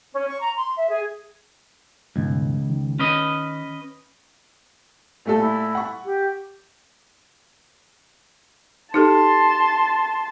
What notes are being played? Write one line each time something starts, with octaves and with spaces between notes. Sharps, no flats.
C#4
C#6
A#5
C6
E5
G#4
C#2 G2 B2 D#3
D#3
C#4 B4 D#5
A#2 A3 A4
E4
F#5 C#6
G4
D#4 G4 A4 A5 C6